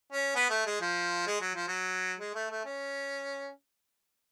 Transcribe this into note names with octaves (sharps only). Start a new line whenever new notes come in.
C#4
B3
A3
G#3
F3
G#3
F#3
F3
F#3
G#3
A3
A3
C#4